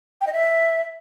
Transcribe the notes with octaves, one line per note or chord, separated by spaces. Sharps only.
G5
D#5
E5